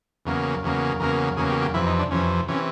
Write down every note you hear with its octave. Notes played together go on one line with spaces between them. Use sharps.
E2 C#3 F#3 A#3
E2 C#3 F#3 A#3
E2 C#3 F#3 A#3 A#4
E2 C#3 F#3 A#3 G#4
G4
G4
F2 C3 E3 E4
D#4
D4
F2 C3 E3 C#4
C3 E3 C#4